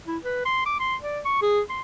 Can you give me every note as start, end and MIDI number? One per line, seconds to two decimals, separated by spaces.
0.07 0.18 64
0.24 0.45 71
0.46 0.66 84
0.66 0.78 86
0.80 0.96 84
1.02 1.20 74
1.26 1.37 85
1.42 1.61 68
1.70 1.82 84